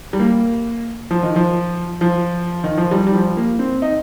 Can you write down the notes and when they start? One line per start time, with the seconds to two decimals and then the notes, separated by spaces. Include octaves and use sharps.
0.13 G3
0.20 A#3
1.11 F3
1.23 D#3
1.36 F3
2.01 F3
2.64 D#3
2.77 F3
2.91 G3
3.07 G3
3.14 F3
3.37 A#3
3.59 C4
3.82 D#4